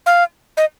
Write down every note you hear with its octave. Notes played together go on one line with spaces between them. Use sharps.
F5
D#5